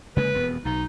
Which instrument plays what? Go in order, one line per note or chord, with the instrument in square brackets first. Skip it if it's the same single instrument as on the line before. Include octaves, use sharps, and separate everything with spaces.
[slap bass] C#3 G#3 A#3 [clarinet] B4
[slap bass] E1 F2 B3
[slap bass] B1 [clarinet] D#4